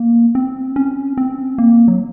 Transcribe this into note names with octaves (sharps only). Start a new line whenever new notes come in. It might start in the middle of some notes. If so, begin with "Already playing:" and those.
Already playing: A#3
C4
C#4
C4
A#3
F#3